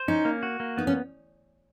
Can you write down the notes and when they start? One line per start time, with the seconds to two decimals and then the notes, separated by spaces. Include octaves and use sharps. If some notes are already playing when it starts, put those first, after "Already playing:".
Already playing: C5
0.08 C#4 D#4
0.25 A#3
0.43 F#4
0.60 A#3
0.78 B3 D#4
0.87 C#4